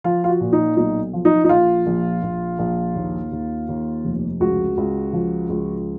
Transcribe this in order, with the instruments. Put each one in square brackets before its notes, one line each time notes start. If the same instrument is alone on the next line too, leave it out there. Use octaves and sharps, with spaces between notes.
[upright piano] F3 F4
F4
F#4
A#2
D#4
B1 D#4
F3
D#4
D#4
A#1 F4
A#1
A#1
A#1
D#2
D#2
D#2
F1
C#2 F#4
C#2
F3
C#2